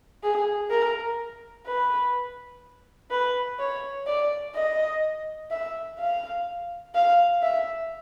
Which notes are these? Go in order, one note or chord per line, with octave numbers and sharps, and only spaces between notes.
G#4
A#4
B4
B4
C#5
D5
D#5
E5
F5
F5
E5